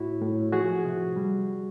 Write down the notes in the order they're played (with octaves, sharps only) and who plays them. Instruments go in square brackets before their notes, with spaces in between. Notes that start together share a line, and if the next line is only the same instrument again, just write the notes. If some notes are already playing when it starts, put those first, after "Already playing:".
Already playing: [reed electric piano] A2 E4 F#4
A2
F3 F#4 G#4
C3
G3